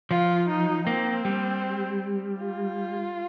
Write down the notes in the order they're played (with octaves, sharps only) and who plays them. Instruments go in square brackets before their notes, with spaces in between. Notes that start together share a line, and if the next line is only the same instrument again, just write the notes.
[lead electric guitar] F3 [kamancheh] F4
[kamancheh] D#4
[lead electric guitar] A#3 [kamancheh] C4
[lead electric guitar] G3
[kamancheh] F4